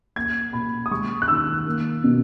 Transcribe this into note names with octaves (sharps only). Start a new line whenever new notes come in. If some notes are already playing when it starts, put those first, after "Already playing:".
A#3 G#6
A#2 B5
D#6
G#3 C#6
F#6
D#3 E6
A#3
B2